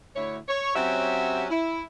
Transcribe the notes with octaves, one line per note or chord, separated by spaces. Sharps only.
D2 E4 C#5
C#5
F#3 C4 C#4 F#4 G4 E5
E4